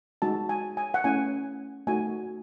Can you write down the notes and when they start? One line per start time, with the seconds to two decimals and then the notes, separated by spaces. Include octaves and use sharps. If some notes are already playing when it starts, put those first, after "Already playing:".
0.22 G#3 D#4 F#4 A5
0.49 G#5
0.77 G#5
0.94 F#5
1.04 A3 C#4 E4 G#5
1.87 A3 D#4 F#4 G#5